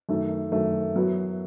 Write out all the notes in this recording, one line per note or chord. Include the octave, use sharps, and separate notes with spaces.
F#2 D#3 A3
F#2 D#3 A3
F#2 F#3 B3 E4